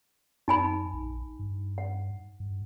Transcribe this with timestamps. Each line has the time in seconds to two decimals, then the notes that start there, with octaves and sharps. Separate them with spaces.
0.48 F#2 D#4 G#5 B5
0.93 A#1
1.39 G2
1.78 F#5
2.40 G2